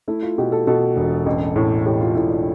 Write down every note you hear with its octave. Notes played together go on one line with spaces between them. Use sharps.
A3 E4
F4
B2 G4
A4
B2 A4
E1
A1
A2
A2 G4
F4
A2 E4
D4